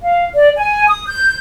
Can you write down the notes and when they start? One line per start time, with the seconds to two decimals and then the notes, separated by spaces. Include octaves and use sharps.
0.02 F5
0.35 D5
0.57 G#5
0.88 D#6
1.07 G6